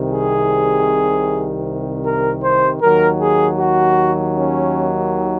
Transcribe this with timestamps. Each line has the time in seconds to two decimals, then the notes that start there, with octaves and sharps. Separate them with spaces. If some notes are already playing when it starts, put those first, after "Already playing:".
Already playing: C2 C3 D#3
0.12 G#4
2.05 A#4
2.43 C5
2.82 D#2 D#3 F#3 A#4
3.20 G#4
3.59 F#4
4.36 C#4